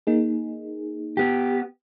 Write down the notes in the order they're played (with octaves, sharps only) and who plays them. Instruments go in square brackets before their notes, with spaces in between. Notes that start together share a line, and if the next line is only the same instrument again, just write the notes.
[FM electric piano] A#3 D#4 G#4
[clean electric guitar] B3 G4